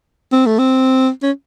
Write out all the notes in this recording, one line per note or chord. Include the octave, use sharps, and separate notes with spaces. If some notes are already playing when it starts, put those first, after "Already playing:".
C4
A3
C4
C#4